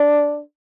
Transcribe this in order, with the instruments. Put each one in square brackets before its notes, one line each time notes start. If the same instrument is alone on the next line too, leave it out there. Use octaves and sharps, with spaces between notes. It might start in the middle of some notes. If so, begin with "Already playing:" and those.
Already playing: [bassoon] D4